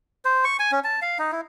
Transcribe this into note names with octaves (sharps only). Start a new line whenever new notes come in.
C5
C#6
G#5
C#4
A5
F5
D#4
E4